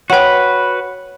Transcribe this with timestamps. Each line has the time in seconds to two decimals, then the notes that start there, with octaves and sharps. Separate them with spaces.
0.10 F#4 B4 C#5 F#5 G5